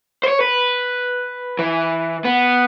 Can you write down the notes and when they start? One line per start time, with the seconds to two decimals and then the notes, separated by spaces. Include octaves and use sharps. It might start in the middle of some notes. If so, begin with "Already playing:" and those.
0.23 C5 C#5
0.41 B4
1.59 E3
2.25 B3